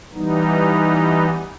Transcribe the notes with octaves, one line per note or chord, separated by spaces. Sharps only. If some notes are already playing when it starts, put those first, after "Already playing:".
E3 G3 B3 D#4